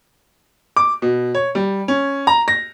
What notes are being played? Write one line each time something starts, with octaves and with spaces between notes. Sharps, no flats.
D6
B2
C#5
G3
C#4
A#5
A#6